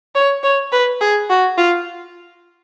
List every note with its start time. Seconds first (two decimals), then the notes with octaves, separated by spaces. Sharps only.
0.15 C#5
0.43 C#5
0.72 B4
1.01 G#4
1.30 F#4
1.58 F4